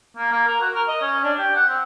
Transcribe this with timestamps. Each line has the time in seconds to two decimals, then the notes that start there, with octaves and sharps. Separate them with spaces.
0.17 A#3
0.32 A#3
0.47 A#4
0.61 F#4
0.75 A#4
0.88 D#5
1.02 C#4
1.24 D4
1.39 G4
1.56 F#5
1.69 C4